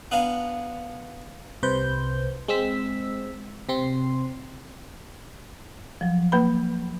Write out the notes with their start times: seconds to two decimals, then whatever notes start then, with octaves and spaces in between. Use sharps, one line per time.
0.11 B3 D4 F5 G#5 A#5
1.63 C2 C3 B4 C5 G6
2.48 G#3 C4 E6 B6
3.69 C3 C4 C6
6.01 F3 F#3
6.32 A#3 B4 B5